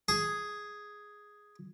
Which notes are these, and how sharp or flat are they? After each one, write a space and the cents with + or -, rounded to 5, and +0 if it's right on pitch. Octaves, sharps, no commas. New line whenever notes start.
G#4 +0